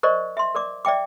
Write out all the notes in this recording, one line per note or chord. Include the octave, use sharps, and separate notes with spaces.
A#4 C5 D5 D#5 C#6
E5 C6
A#4 D5 D6
D5 E5 G5 D6